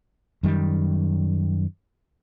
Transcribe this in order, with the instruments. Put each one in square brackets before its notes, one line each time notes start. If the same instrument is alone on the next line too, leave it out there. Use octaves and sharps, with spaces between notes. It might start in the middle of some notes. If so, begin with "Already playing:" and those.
[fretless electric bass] F#2 D#3 G3